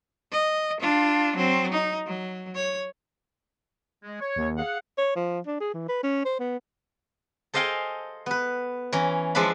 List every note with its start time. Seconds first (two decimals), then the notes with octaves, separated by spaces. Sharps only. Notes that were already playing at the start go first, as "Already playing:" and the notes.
0.32 D#5
0.80 D4 F4
1.36 F#3 C4
1.72 D#4
2.07 F#3
2.55 C#5
4.03 G#3
4.21 C#5
4.36 D#2
4.57 G#4 F5 F#5
4.98 C#5
5.16 F3
5.46 D4
5.60 G#4
5.74 E3
5.88 B4
6.03 C#4
6.25 C5
6.39 B3
7.54 A4 C5 D#5 F5 G5 G#5
8.26 B3 B4
8.92 E3 C#4 A#5
9.35 F3 G#3 D4 E5 B5